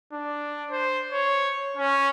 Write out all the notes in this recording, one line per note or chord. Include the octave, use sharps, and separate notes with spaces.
D4
C5
C#5
C#4